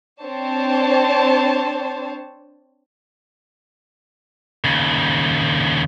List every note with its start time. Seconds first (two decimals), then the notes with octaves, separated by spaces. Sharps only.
0.23 C4 D4 C5 C#5 A5
4.65 D#2 C#3